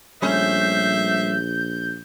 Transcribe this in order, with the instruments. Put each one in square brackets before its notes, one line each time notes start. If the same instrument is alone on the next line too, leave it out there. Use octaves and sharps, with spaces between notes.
[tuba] A#1 [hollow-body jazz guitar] G3 A3 C#4 [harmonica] C5 E5 [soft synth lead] G6